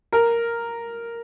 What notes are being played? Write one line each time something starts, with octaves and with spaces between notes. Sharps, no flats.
A#4